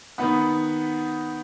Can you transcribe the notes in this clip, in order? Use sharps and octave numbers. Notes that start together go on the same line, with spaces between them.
D#3 B3 D#4 F#5 B5